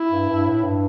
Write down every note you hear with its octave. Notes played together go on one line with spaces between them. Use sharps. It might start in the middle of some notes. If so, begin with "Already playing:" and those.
Already playing: E4
G2
G2
A2
G2